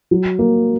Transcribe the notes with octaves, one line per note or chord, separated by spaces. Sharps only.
F#3
A#3